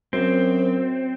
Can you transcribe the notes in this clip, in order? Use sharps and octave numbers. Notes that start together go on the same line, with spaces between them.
F#2 C4